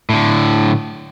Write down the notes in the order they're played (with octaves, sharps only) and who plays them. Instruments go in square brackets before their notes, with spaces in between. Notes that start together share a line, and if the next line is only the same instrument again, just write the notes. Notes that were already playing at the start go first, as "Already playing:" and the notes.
[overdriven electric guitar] A2 D3